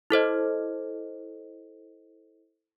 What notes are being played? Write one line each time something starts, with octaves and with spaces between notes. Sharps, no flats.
E4 A4 C5 D#5